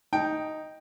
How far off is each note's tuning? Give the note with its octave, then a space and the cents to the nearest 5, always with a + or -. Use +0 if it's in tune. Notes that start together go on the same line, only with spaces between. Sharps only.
D#4 +0 G5 +0